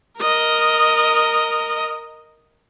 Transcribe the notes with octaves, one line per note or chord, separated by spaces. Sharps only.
A#4 D#5